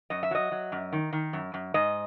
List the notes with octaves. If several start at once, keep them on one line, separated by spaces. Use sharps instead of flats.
F#2 D#5
E5
F#3 D#5
F#3
F#2
D#3
D#3
F#2
F#2
G#2 D#5